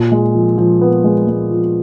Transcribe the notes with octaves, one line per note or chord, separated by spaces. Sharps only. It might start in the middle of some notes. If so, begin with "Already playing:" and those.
Already playing: A#2
G#3
F3
F3
B3
G#3
G#3
F3